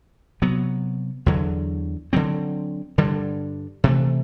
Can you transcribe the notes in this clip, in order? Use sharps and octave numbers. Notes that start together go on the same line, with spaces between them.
C3 F#3 B3
E2 D3 F#3
D3 F#3 C4
G2 D3 G3
C3 E3 A3